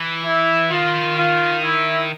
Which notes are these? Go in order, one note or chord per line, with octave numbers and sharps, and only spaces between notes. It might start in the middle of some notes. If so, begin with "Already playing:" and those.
Already playing: E3
E4
D#3 F4
F4
E4